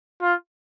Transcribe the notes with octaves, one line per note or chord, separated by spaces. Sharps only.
F4